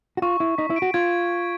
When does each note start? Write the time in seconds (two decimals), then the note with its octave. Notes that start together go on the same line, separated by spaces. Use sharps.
0.17 F#4
0.22 F4 C#6
0.40 E4 C#6
0.58 D#4 B6
0.70 E4
0.76 D7
0.82 F#4
0.94 F4 G#6